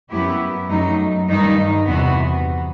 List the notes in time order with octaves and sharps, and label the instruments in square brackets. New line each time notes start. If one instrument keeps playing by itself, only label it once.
[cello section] F#2 F#3 B3 E4 G4
F#2 F#3 A3 D#4
G2 D#3 G3 D#4
E2 C3 E3 B3 F#4